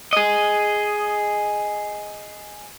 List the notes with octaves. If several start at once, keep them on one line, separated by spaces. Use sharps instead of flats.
G#4 D#5